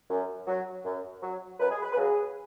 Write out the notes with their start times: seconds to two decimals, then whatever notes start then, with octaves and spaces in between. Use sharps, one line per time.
0.10 F#2
0.47 F#3
0.85 F#2
1.23 F#3
1.59 F#2 B4
1.70 G#4
1.82 B4
1.93 B4
1.96 C#3 F#3 G#4